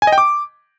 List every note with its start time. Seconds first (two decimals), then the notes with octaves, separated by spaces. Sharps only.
0.02 G#5
0.07 D#5
0.13 G5
0.18 D6